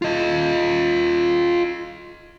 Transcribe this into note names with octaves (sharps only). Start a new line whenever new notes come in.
F4 D#5